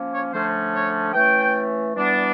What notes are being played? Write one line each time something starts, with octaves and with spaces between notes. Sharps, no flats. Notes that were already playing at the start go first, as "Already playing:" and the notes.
Already playing: F3 A#3 C#4
C#5
D3 F3 A3 C#4 C5
C#5
E3 A3 C#4 G5
E3 G3 B3 D4